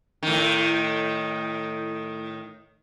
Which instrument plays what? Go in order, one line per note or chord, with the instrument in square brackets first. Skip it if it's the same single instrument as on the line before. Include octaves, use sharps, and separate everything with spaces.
[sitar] A2 D#3